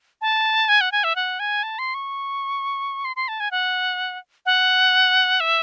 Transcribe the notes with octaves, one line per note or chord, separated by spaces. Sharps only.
A5
G#5
F#5
G#5
E5
F#5
G#5
A5
C6
C#6
C6
C6
A5
G#5
F#5
F#5
E5